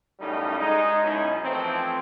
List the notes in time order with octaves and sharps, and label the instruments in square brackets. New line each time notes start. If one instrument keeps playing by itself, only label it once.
[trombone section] F#2 A2 C#3 G3 A3 D#4
G#3 D#4
F#2 B2 G#3 C#4 D#4 E4
E3 F3 A3 C4